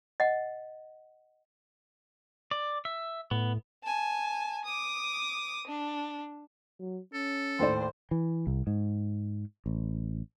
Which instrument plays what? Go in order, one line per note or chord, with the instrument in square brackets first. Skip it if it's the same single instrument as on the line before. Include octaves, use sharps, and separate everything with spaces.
[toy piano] D#5 F#5
[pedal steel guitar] D5
E5
[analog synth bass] A2 [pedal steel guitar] B3
[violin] G#5 A5
D6 D#6
D4
[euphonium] F#3
[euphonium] C#4 [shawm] A4
[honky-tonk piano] D#2 A2 D5 [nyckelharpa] C5
[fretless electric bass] E3
C2
G#2
A1